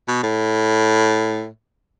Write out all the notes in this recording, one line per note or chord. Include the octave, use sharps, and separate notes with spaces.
B2
A2